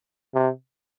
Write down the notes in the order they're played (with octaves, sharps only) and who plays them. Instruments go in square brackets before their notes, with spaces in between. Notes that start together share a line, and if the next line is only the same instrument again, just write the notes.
[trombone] C3